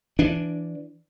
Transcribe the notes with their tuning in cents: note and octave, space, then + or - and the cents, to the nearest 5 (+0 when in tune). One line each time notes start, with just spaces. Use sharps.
E3 +15 D4 -5